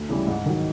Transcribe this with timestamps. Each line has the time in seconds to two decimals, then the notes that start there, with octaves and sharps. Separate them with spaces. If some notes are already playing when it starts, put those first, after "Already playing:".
Already playing: D2
0.09 C#3 E3 G3
0.27 G#2
0.46 D#3 F#3